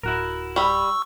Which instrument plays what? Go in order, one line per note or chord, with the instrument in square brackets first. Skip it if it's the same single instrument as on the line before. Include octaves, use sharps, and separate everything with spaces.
[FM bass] D1 [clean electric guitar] E4 F#4 A#4
[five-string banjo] G3 B5 [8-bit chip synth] C#6 E6